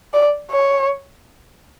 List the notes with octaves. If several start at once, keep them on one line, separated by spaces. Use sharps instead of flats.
D5
C#5